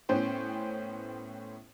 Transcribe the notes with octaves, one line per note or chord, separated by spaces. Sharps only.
A2 B3 C#4 C5 G5